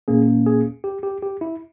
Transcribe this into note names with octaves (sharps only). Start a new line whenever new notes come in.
A#2 A#3 C#4 G#4
G#4
G4
G4
G4
E4